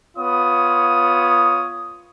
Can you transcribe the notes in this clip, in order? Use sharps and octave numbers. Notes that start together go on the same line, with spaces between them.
B3 F4 C#5 D#6